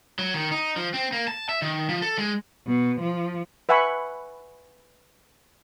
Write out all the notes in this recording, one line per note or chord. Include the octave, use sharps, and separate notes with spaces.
F#3
D#3
D#4
F3
C4
A#3
A5
E5
D#3
F3
A4
G#3
B2
F3
B4 E5 F#5 G#5 B5 C#6